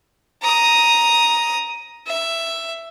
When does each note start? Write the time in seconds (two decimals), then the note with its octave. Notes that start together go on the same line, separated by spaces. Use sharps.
0.43 A#5 D#6
2.07 E5